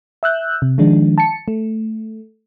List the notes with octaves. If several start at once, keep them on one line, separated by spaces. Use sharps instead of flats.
E5 E6 F#6 G6
C3
D#3 F3 G#3 D4
A5 C#7
A3